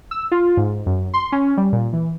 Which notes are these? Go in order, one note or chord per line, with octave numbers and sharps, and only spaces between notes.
E6
F4
G#2
F#2
C6
C#4
G3
A#2
E3